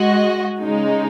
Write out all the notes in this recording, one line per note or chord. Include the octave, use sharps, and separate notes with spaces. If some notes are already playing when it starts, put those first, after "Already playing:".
Already playing: G#3 F#4 D#5
C#3 G#3 D#4